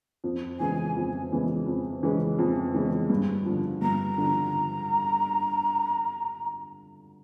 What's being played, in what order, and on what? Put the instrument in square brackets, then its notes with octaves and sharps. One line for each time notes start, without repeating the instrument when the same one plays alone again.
[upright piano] F2
[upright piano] C#3 E3 G#3 C#4 [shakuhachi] G#5
[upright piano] F2
C#3 E3 G#3 C#4
F2
C#3 E3 G#3 C#4
F2
C#3 E3 G#3 C#4
G2
D3 F3
[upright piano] G2 [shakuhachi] A#5
[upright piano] D3 F3